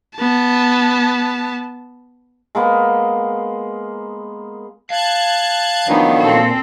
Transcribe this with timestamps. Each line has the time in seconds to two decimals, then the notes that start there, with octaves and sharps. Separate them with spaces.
0.17 B3 A5
2.55 G#3 A#3 B3
4.90 F5 A5 F#6 G#6
5.88 D#3 F3 F#3 B3 D4 D#4
6.19 A#2 C4 A4